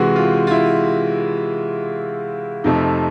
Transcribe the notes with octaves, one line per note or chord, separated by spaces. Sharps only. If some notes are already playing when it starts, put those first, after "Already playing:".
Already playing: C3 E3 G#3 F#4
F4
F4
E4
F2 C3 F3 A3 D#4